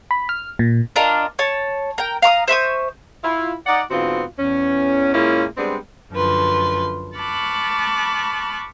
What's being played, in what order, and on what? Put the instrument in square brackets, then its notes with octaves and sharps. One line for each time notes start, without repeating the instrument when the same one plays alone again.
[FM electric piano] B5
F6
A#2
[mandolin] D4 F4 A#4 D#5
C#5 A5
A#4 G5
F5 A#5 D6 D#6
C5 E5 C#6 D#6
[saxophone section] E4 F4
D#4 D5 F#5
G#2 D3 B3 C4 F4 F#4
E2 C#4
A#2 G#3 A#3 C#4 E4
G3 G#3 B3 C4 D4
[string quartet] F#2 D3 F3 B4 C6
A5 B5 C#6 D6 F6 F#6